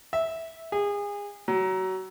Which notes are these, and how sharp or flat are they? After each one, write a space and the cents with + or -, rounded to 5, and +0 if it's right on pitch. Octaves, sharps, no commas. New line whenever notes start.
E5 -10
G#4 -30
F#3 +25